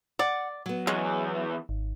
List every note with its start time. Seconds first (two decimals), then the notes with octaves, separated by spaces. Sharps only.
0.19 D5 F#5
0.66 F#3 B3
0.87 E2 E3 G#3 C#4
1.69 G#1